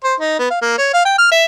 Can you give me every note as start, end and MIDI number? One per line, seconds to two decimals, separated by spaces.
0.04 0.14 72
0.20 0.36 63
0.39 0.46 59
0.50 0.58 77
0.62 0.76 58
0.78 0.90 73
0.94 1.05 77
1.05 1.14 79
1.18 1.27 89
1.31 1.45 76